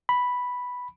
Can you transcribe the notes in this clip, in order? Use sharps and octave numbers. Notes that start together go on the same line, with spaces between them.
B5